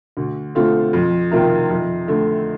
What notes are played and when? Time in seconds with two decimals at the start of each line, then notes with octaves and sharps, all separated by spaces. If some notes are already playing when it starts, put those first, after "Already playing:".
0.17 D2
0.55 D3 A3 C4 F4
0.93 F2
1.31 C3 D#3 A#3 F4
1.70 F2
2.08 D3 A3